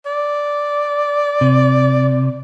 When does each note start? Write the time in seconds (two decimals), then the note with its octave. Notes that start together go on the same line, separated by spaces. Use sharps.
0.06 D5
1.41 C3